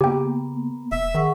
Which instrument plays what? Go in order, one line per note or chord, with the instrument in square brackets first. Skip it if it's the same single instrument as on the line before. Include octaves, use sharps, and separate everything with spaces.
[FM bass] C#3 [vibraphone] A#3 B3 [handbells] G4 G5
[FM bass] E1 [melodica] E5
[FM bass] D#3 [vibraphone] G#4 F#5 C#6